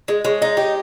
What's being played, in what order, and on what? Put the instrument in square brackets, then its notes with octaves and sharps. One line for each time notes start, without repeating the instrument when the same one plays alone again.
[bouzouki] G#3 [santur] D#5
[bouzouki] G#3 [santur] C#5
[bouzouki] D#4 [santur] D#5
[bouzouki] G4 [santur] D#5